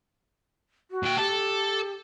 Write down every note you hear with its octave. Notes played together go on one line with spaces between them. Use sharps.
F#4
A#2 G5
G4 A4